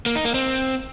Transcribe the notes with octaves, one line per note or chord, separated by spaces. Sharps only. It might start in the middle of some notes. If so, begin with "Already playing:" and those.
A#3
D#4
A#3
C4